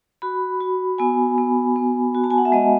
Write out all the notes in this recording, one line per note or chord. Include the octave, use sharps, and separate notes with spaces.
F#4 B5
F#4
B3 G#5
B3
B3
F#4
A5
G#5
F#5
E5
G#3 D#5